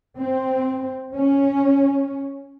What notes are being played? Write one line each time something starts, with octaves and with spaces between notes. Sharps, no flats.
C4
C#4